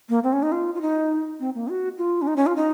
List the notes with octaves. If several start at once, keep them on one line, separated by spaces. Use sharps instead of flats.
A#3
C4
C#4
D#4
F4
F4
D#4
C4
A#3
F#4
F4
C#4
D#4
C#4
F4
D#4